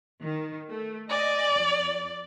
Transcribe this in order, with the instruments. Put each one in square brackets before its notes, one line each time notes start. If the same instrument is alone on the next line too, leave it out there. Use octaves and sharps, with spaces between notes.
[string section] D#3
A3
[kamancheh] D5 [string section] D#5 G#5
[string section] F2